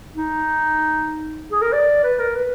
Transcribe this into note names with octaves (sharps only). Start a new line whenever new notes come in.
D#4
G#4
A#4
D5
B4
A#4
B4